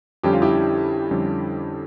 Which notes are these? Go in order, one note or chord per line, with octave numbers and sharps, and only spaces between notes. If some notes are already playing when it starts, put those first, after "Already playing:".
F2 D3 G3 C#4 G4
F4
E4 G4
F2 D3 G3 C#4